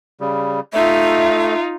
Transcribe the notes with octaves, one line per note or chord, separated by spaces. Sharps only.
C#3 G3
A3 D#4 F4 E5